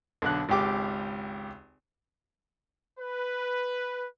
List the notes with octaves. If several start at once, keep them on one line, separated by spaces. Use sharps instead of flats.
B1 D3 F#6
G#1 C#2 G4 D6
B4